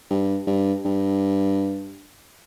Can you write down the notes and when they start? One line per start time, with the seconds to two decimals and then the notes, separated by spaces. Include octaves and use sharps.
0.10 G2
0.47 G2
0.85 G2